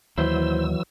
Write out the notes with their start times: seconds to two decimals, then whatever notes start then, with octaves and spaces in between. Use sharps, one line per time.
0.18 D#2 E3 F#3 E4 C5 E6